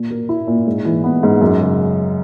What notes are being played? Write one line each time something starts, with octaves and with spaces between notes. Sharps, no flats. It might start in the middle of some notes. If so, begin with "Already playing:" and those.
Already playing: A#2
A#3
E4
A#2
G#2
E3
B3
G#2
F#2
C#3